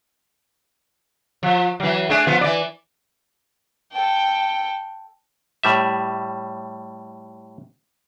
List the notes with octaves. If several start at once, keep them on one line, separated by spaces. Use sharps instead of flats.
F3
E3 F#3
A3 D4 G#4
F3 B3 F4
E3 D5
A4 G5
A2 G3 E5